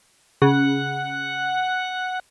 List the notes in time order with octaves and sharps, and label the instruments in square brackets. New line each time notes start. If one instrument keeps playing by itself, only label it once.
[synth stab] C#3 [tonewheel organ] F#5